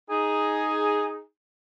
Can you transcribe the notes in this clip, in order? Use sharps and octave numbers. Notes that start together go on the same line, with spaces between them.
D#4 G#4